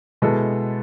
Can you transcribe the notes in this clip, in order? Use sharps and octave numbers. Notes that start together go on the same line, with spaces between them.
B2 G#3 B3 E4 A4